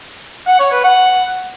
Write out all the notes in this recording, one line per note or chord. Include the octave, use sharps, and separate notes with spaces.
F#5
C#5
B4
F#5